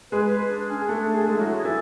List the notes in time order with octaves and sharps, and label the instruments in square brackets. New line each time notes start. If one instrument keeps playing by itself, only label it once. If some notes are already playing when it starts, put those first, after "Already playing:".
[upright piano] G#3 G#4 [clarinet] B4
[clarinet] B4
D4
C#4
[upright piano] G#4
[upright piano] A3 A4 [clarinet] D4
[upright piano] G#4
A4
G#3 G#4
E4
F#3 F#4
[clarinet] G#4
[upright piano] E3 E4 [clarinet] A4